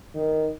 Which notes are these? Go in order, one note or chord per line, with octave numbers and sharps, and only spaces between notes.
D#3